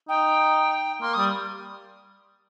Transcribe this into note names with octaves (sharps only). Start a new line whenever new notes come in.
D#4 G5
A#3 C6
G3 D#6